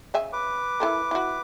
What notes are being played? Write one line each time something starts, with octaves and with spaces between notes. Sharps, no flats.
C#3 E5 G#5
B4 D6
E4 A4 A#4
E4 F#4